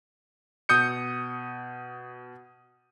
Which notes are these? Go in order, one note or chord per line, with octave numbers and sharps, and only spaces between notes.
B2 D#6 G6 C#7